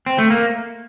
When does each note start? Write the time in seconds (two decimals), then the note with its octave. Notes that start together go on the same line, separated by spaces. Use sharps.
0.06 C4
0.18 A3
0.30 A#3